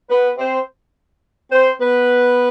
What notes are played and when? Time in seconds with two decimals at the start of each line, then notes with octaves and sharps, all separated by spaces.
0.10 B3 B4
0.39 C4 C5
1.52 C4 C5
1.81 B3 B4